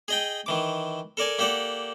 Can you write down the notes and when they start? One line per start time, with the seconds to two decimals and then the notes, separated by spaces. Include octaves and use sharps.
0.08 G#4 D#5 G5
0.46 D#3 E3 D6
1.17 A4 A#4 D5 G#5
1.39 A#3 G4 A4 D5 F#5